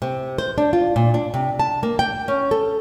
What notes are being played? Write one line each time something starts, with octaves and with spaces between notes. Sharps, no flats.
C3
C5
D4
F4
A#2
D4
C3
A5
A#3
G5
C#4
A4